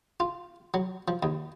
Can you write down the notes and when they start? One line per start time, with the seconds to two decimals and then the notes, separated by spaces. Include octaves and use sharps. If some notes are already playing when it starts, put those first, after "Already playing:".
0.20 F4
0.74 F#3
1.08 F3
1.23 D#2